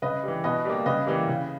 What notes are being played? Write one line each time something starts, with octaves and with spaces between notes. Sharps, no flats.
C#3 B4 D#5
E3 G3
B2 B4 D#5
G3 A#3
C#3 B4 D#5
E3 G3 A#3
C#3